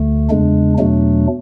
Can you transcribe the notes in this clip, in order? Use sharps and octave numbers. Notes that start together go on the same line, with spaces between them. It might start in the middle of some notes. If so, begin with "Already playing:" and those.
Already playing: D2 D3 A3
E2 C#3 G#3 D4
E2 B2 F#3 A3 D4